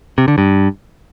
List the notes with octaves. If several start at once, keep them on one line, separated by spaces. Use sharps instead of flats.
C3
D3
G2